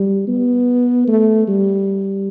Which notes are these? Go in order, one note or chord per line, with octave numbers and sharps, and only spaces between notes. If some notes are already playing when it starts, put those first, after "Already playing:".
Already playing: G3
B3
A3
G3